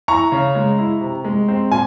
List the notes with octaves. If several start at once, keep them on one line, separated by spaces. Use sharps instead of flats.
E4 A#5 C#6
C#3
G#3
E4
C3
G#3
C4
A#2 G#5